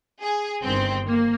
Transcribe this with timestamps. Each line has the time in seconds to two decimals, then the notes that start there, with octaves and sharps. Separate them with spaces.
0.22 G#4
0.63 G1 G2 D#3 C4
1.05 A#3